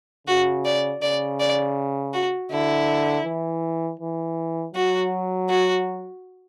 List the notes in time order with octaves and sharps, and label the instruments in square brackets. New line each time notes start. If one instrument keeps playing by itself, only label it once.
[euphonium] C#3 [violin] F#4
[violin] D5
[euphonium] C#3 [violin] D5
[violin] D5
F#4
[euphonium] D3 [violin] E4
[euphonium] E3
E3
[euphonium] F#3 [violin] F#4
[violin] F#4